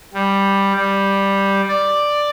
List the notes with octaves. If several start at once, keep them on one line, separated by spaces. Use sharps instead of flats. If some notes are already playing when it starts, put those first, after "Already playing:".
G3
G3
D5